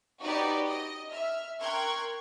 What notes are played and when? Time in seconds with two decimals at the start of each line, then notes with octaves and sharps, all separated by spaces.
0.22 D#4 F#4 G4 B4 C#5 D5
0.67 D#5
1.11 E5 F6
1.61 A#4 G5 C6 C#6 F#6 G#6